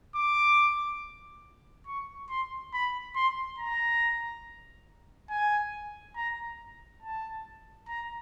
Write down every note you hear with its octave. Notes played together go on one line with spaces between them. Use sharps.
D6
C#6
C6
B5
C6
A#5
G#5
A#5
A5
A#5